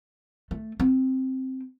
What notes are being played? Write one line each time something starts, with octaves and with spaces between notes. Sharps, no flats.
A3
C4